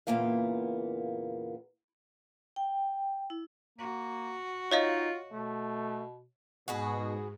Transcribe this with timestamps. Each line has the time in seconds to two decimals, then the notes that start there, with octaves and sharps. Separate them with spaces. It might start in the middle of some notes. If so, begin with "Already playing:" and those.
0.07 E2 A#2 C#3 A#3 B3 F5
2.56 G5
3.30 E4
3.78 A#3 F#4
4.72 D#4 F4 C#5 D#5 F5
5.32 B2 A3
6.68 G#2 B2 F#4 G#4 B4